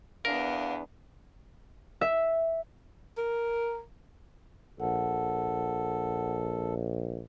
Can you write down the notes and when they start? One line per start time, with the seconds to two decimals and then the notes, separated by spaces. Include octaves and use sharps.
0.25 E2 B3 D4 A#4 F5
2.01 E5
3.18 A#4
4.80 A#1 A4 F#5